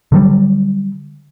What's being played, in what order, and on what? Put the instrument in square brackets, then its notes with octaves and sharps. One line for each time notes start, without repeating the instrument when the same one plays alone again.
[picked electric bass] D3 F#3 G3